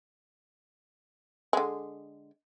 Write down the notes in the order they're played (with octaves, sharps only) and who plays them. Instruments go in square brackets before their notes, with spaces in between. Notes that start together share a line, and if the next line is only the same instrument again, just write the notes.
[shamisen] D3 G#3